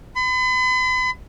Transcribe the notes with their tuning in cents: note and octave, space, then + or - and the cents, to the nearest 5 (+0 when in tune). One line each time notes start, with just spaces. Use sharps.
B5 +45